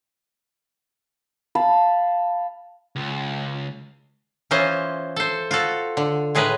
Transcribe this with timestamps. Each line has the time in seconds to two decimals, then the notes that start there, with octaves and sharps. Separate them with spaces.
1.55 F5 A5 B5
2.96 C#2
4.51 E3 C#4 F4 C5 D#5
5.16 A4 C5
5.51 F4 F#4 A4
5.97 D3
6.35 A2 G#3 G#4 A#4 B4